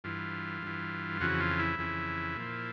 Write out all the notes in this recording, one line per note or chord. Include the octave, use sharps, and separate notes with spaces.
G2 E3 F4
G2 E3
F2 C#3 E3 F#4
F4
E4
F2 C#3 E3
A#2 F3